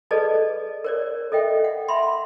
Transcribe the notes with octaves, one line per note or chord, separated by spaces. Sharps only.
G#4 A4 B4 D5 D#5 A5
A#4 C#5 D5
A4 D#5 E5 G5
F#5
E5 B5 C6